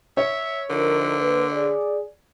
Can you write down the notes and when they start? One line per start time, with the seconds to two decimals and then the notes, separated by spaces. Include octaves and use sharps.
0.17 C#5 E5
0.70 D3 F3 D#4 A#4
1.18 A#3 B4
1.52 G#4 D5